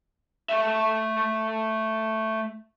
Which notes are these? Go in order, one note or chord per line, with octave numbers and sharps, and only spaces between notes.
A3 E5